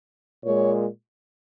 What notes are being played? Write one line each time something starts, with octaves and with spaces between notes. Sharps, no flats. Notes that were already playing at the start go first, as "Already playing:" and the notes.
A#2 G#3 C#5